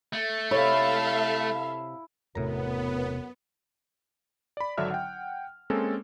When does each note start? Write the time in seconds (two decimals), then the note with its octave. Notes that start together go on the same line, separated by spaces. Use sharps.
0.13 A3
0.51 C3 E4 A4 C#5 E5 F5
2.35 E1 F#2 A2 C3 B3 A#5
4.57 D5 B5
4.77 G#1 D3 F#3 D4 E5 F6
4.91 F#5 G5
5.70 G#3 A#3 C4 C#4 A4